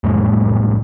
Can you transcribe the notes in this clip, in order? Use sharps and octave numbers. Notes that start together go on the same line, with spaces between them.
F2 A2 G#3 A#3